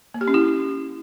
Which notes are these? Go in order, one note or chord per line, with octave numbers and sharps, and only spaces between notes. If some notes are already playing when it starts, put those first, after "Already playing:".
A#3
G4
C#4
E4